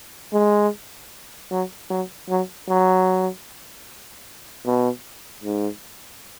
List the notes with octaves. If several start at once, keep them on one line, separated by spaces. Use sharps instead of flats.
G#3
F#3
F#3
F#3
F#3
B2
G#2